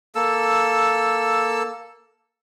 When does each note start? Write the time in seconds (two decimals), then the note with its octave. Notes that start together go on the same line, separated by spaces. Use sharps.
0.15 A#3 A4 E6